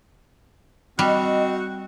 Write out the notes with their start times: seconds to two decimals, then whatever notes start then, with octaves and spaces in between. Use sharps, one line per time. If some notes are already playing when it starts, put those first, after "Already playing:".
0.99 G3 C4 F#4 D#5